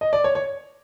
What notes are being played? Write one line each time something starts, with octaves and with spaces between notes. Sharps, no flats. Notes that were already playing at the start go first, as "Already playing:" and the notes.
D#5
D5
C#5
C#5